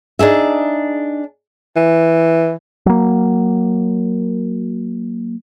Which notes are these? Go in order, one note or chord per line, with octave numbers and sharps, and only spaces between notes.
D4 D#4 G#4 E5
E3
F#3 A#3